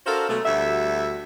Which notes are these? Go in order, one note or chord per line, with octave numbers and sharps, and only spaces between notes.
D4 F#4 A4 A#4 C5 F5
B2 F#3 G#3 A3
D2 G3 F#4 E5